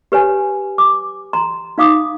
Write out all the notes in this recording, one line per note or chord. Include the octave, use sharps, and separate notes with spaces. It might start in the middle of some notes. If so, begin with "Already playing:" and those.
G4 B4 C#5 G#5
D6
A#5 C6
D#4 F5 D6 D#6